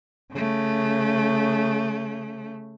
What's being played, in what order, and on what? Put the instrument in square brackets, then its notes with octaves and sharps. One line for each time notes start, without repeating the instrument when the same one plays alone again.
[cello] C#3 A3